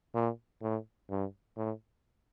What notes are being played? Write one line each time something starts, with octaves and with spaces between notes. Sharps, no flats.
A#2
A2
G2
A2